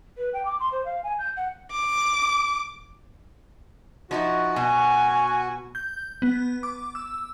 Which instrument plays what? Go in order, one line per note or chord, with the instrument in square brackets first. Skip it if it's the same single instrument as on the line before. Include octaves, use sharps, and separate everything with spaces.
[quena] B4
G5
D6
C6
C5
F5
G#5
G6
F#5
[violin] D6
[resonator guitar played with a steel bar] F3 D#4 E4 [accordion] F#4
[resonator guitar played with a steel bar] B2 [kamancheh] G#5
[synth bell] G6
B3
D6
E6